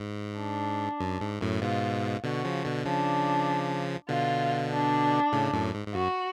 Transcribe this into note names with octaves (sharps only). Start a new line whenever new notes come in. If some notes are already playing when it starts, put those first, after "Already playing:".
Already playing: G#2
D4
F#2
G#2
F#2 A2
G#2 B2 F4
B2 D3 F#4
C#3 F3
B2 D3
C#3 F3 D4
B2 D3 F4
D4
A2 C#3
F#2 A2
G#2
G#2
F#2 F#4